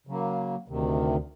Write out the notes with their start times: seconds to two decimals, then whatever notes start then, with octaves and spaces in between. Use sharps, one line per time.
0.07 C#3 F#3 A#3
0.68 D2 C3 D#3